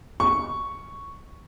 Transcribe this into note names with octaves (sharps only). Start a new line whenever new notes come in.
C#6